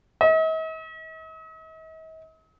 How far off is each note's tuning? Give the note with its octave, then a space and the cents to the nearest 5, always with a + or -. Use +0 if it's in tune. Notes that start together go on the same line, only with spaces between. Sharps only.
D#5 +45